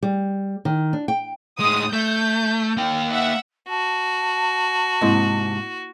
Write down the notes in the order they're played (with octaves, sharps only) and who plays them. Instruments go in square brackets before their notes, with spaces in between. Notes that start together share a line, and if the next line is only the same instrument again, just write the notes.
[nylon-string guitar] G3
D#3
D4
G5
[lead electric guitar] A2 G#3 [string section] D#6
[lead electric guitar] A3 [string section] G6
[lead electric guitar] A#3 G5
[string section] E5 F#5
[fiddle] F#4 [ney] A5
[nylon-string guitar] G#2 C3 [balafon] A#3 E4 D#5